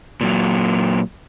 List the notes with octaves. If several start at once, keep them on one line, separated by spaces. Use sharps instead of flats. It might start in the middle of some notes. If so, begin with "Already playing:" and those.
A#2 F#3